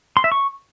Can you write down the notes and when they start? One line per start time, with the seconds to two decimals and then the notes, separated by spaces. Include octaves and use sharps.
0.17 C6
0.24 E5
0.32 C#6